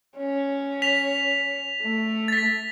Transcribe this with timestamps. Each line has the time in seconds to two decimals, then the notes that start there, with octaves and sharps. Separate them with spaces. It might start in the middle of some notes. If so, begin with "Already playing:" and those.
0.17 C#4
0.82 B6 F7
1.83 A3
2.28 A6 B6